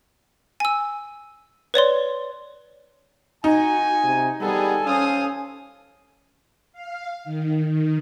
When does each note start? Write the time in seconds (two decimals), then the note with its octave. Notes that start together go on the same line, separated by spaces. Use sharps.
0.60 G#5 E6
1.74 B4 C#5 D5 C6
3.44 D#4 F#4 G#5
4.04 C3
4.41 G3 B3 G#4 A4 G#5
4.87 C#4 C5 F5 D#6
6.73 F5
7.24 D#3
7.67 D#3